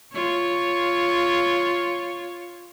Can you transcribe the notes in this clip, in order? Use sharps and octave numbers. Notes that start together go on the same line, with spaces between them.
F4 C#5